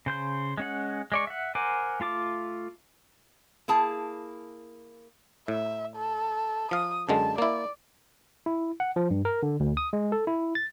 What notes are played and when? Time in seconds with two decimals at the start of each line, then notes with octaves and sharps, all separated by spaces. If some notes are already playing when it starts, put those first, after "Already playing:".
0.06 C#3 C5 G6
0.58 G#3 C#4 F#5
1.12 G#3 D5 C#6
1.27 E5 F#5
1.55 A#4 C5 F#5 G#5 D6
2.00 A3 F4 A5 D6
3.68 A#3 E4 G#4 A5
5.48 A2 E5
5.96 A4
6.71 F3 F5 D#6
7.09 F#2 D3 G#3 A5
7.38 A#3 E4 D5
8.46 E4
8.80 F#5
8.96 F3
9.11 G2
9.25 A#4
9.43 D3
9.60 D2
9.77 D#6
9.93 G#3
10.12 A4
10.27 E4
10.55 A6